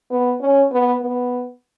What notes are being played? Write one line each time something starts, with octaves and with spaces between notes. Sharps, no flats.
B3
C#4
B3
B3